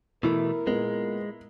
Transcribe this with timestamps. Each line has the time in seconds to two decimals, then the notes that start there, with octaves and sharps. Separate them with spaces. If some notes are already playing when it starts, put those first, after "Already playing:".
0.23 B2 E3 A3 E4 A#4
0.67 A#2 G#3 B3